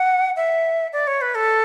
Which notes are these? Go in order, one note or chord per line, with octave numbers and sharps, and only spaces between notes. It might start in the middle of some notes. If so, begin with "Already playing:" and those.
Already playing: F#5
E5
D5
C#5
B4
A4